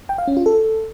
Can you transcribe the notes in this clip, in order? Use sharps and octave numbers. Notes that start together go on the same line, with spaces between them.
G5
F5
C#4
F4
A4